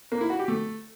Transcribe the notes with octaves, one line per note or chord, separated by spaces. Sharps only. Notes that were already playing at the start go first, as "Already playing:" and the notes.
A#3
E4
F#4
G4
A3